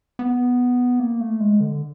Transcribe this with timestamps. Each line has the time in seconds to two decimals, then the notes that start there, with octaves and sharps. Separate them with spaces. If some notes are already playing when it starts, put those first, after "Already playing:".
0.19 B3
1.00 A#3
1.20 A3
1.40 G#3
1.60 D3